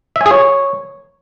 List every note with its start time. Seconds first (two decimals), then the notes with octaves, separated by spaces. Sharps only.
0.16 E5
0.21 G#5
0.26 G#4
0.31 C#5